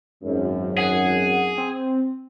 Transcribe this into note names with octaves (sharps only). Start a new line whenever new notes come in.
G#1 F#2
G#4 F#5
C4